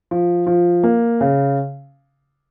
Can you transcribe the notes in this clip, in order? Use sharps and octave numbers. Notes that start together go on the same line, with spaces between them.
F3
F3
A#3
C#3